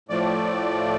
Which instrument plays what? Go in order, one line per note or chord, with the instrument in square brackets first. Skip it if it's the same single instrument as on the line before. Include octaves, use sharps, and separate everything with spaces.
[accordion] A2 F3 A3 D5